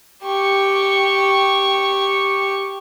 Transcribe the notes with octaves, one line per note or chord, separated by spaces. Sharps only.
G4 C#6